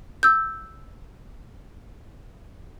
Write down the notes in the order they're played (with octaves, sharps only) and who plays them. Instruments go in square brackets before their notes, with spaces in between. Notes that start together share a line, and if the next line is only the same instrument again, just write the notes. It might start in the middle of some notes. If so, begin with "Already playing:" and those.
[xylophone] E6 G6